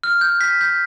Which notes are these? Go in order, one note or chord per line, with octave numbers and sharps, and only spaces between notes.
F6
G6
B6
G6